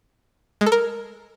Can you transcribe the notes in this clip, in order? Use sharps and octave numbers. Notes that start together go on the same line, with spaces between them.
G#3
A4
A#4